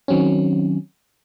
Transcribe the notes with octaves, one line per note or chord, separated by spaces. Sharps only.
D#3 F#3 C4 C#4